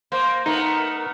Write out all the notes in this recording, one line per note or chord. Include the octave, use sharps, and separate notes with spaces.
A#3 C5
A3 B3 D#4 A#4